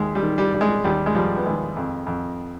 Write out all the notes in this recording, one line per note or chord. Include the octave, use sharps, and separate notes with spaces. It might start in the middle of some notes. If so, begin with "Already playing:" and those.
Already playing: D#2 G#3
G3
D#3
G3
G3
G#3
D#2 G3
G#3
F3 G3
B3
D#2 G#3
F2
F2